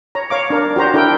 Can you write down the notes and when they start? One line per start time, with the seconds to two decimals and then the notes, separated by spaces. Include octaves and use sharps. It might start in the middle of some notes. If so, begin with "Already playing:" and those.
0.15 C#5 A#5
0.30 C#5 F5 D6
0.50 D4 A#4 D5
0.76 F#4 G4 C5 A#5
0.94 D4 E4 A4 A#4 G5